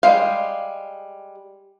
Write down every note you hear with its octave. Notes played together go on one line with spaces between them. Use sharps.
G3 G#3 F5